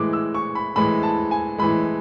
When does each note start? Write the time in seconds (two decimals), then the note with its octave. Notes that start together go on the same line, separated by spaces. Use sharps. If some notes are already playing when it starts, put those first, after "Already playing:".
Already playing: A2 E3 G#3 D6
0.13 E6
0.34 C#6
0.55 B5
0.76 A2 E3 G#3 B5
1.03 A5
1.31 G#5
1.58 A2 E3 G#3 B5